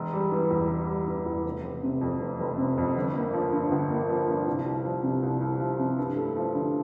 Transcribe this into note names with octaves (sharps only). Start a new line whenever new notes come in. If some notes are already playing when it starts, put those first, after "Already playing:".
Already playing: E1
G3
E3
E2
E1
G3
E3
E2
F1
F1
C3
F2
F1
F1
C3
F2
G1
A#3
F3
G2
G1
A#3
F3
G2
C2
C2
F3
C3
C2
C2
F3
C3
G2
A3
F3
D3